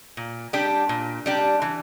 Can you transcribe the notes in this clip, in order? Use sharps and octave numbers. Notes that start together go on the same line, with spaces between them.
A#2
G3 D4 G4
A#2
G3 D4 G4
E3